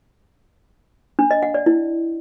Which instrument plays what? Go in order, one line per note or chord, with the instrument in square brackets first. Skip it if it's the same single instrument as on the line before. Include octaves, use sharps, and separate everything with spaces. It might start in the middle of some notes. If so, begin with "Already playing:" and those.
[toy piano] D4
D#5
F#5
D5
E4